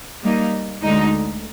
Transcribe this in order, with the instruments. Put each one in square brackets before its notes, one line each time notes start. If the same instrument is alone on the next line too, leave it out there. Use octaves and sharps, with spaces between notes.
[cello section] G3 A#3 D#4
D2 D3 G#3 D#4